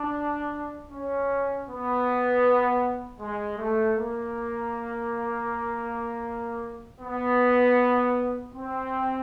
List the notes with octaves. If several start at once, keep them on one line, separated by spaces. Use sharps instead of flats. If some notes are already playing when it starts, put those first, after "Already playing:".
Already playing: D4
C#4
B3
G#3
A3
A#3
B3
C4